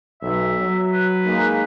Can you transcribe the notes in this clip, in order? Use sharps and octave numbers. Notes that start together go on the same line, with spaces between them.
B1 E5
F#3
B4
G#3 A#3 D#4